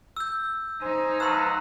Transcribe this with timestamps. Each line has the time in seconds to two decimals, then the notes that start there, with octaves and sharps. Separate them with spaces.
0.17 E6 G6
0.81 D#4 C5 G#5
1.20 F#3 B4 F5 A5 C6 E6